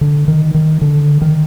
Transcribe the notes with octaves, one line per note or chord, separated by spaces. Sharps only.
D3
D#3
D#3
D3
D#3